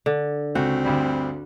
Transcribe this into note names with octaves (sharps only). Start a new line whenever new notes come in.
D3
C#2 C4 F#4
D2 G2 G3